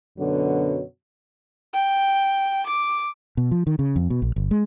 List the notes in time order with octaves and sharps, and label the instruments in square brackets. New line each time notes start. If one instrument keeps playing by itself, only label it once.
[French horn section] F#2 B2 D3 F#3
[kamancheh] G5
D6
[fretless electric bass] B2
F3
D#3
C#3
F2
B2
A#1
G1
G#3